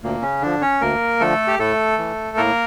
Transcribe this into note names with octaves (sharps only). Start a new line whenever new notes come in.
D2 A#2 A#3
C#3 C#4
D3 F3 D4
C#4 C#5
D2 A#3 A#4
D3 F3 A3 A4
G4
A2 A3 A4
E3
A2 A#3 A#4